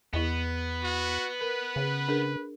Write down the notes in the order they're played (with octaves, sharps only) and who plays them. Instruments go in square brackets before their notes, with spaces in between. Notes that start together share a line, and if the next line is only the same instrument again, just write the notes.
[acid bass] E2 [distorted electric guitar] B3 [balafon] E4 D#5
[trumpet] F#4
[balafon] A#4 [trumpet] B4
[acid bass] C#3
[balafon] D4 G#4 A#4